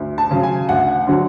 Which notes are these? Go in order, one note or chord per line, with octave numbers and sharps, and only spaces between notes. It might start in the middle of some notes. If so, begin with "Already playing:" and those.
Already playing: D2
A5
C#3 F#3
G#5
D2 F#5
D3 F#3